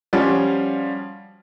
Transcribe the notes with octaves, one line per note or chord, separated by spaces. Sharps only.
F3 G3 C#4 F4 F#4